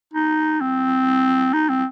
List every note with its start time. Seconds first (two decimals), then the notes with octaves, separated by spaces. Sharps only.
0.14 D#4
0.61 C4
1.54 D#4
1.69 C4